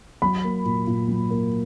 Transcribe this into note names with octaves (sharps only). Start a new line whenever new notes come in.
F#3 B5
A#3
A#2
A#2
F#3
A#3